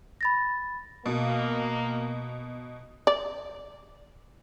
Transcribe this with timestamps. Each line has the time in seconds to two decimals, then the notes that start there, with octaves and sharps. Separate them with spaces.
0.21 B5 A6 A#6
1.06 B2 A#3
3.07 D5